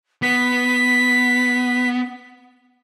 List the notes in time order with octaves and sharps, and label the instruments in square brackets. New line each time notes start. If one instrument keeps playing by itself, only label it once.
[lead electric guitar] B3 [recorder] B6